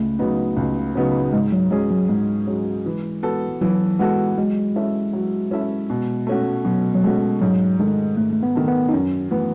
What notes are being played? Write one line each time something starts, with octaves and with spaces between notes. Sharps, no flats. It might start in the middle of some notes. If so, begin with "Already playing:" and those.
Already playing: C#2 A3
C#3 F#3 B3 D#4
C#2
C#3 F#3 B3 D#4
G#2 G#3
F#3
F#3 G#3 C#4 G#4
F#3
G#2 G#3
F#3 C#4 G#4
E3
B3 F#4 A4
E3 F#3
G#3 B3 F#4 A4
F#3 G#3
C#4 E4 A4 E5
F#3
C#4 E4 A4 E5
B2
A3 C#4 F#4
B2 F#3
F#3
G#3 A3 C#4 F#4
G#2 F#3
D#3 G#3 A3
G#2 A3
A3
B3
D#3 A3
B3
D#4
F#2 C#4
E3 A3 B3